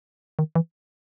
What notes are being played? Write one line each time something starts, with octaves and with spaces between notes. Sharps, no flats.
D#3
E3